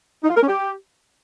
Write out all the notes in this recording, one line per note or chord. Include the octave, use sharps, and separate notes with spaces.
D#4
F4
A#4
C#4
G4